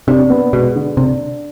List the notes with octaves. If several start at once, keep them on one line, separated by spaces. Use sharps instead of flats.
C3 D4
B3
B2 G#3
D3
C3 D4